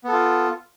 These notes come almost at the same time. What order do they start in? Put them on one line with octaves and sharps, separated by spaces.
B3 A4 F4